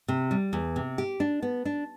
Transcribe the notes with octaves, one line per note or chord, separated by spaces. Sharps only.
C3
G3
E2
C3
G4
D4
B3
D4